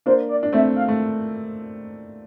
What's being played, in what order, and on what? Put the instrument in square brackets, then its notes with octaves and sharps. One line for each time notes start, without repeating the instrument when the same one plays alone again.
[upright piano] A#3 D4 [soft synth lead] C5
[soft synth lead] D5
[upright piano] D4
[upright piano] A3 C4 [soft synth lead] E5
[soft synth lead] F5
[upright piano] A3